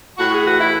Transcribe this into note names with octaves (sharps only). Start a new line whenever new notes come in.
A2 F#4
G#4
E3 F#4
E4